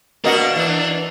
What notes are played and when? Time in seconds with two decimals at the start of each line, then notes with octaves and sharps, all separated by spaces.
0.24 B2 A#3 D4 F#4 A#4 D#5 F#5
0.56 E3